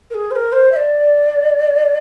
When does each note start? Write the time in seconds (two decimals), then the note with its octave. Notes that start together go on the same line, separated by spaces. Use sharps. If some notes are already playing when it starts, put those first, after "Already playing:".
0.10 A#4
0.14 G#4
0.30 C5
0.35 A#4
0.52 C5
0.71 E5
0.76 D5